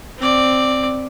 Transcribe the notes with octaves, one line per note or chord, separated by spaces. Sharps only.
C4 D5